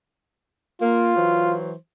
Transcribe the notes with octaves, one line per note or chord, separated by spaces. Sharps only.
A#3 F4
E3 F#3 C5